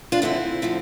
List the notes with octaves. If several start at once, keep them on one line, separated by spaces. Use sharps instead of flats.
D4 F4
E2 D3 F3 A3 C4 E4
D3 F3 A3